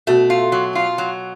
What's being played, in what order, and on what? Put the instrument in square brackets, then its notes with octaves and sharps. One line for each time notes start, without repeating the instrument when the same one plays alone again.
[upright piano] B2 [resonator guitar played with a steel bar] A3
[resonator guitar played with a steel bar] F4
F#3
F4
F#3